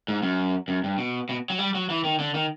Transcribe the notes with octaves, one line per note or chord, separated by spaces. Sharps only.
G#2
F#2
F#2
G2
B2
B2
F#3
G3
F#3
E3
D#3
D3
D#3